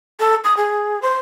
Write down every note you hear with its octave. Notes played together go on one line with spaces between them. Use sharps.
A4
D#6
G#4
C5